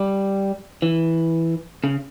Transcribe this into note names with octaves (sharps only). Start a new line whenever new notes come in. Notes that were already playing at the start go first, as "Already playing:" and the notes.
Already playing: G3
E3
C#3